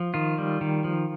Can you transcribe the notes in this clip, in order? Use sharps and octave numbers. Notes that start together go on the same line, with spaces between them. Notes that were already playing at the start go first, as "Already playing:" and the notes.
Already playing: F3
D#3 F4
G3
D#3
F3